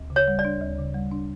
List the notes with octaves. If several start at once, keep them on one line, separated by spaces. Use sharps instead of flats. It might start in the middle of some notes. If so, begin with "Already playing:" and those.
Already playing: D2
C#3
C#5
G3
D5
D4
D2
C#3
G3
D4